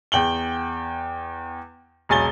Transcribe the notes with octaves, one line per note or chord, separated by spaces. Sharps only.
E2 G5 F#7 G7
E1 B1 G#5 A6 G7